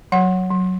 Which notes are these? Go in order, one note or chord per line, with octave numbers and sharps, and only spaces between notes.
F#3 F#5
F#3